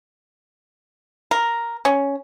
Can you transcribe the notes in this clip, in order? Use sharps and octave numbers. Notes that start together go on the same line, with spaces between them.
A#4
C#4